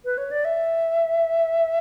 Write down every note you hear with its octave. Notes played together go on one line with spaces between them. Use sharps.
B4
C#5
D5
E5